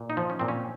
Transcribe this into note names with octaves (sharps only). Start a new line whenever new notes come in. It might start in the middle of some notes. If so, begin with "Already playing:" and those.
Already playing: A#2
D#4
F3
C#4
A#2 C4
C#4